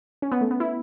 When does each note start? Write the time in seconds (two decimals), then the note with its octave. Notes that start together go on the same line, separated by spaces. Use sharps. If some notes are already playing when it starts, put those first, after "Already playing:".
0.22 C#4
0.32 B3
0.41 A3
0.51 B3
0.60 E4